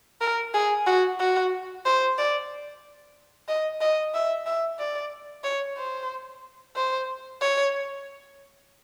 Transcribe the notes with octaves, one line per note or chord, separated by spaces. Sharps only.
A#4
G#4
F#4
F#4
C5
D5
D#5
D#5
E5
E5
D5
C#5
C5
C5
C#5